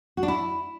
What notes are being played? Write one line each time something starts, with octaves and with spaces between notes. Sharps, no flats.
F#4
D4
E4